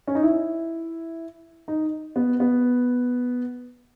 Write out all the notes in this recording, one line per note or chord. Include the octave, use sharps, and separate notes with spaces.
C#4
D#4
E4
D#4
B3
B3